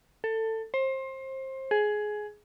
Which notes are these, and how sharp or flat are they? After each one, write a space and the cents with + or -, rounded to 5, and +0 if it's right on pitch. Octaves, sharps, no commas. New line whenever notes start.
A4 +20
C5 +25
G#4 +15